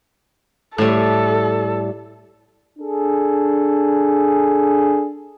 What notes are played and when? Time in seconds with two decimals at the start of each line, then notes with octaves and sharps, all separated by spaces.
0.78 A2 G3 A4
2.78 D4 G#4 A4